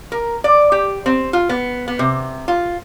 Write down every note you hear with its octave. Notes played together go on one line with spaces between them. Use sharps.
A#4
D5
G4
C4
F4
B3
B3
C3
F4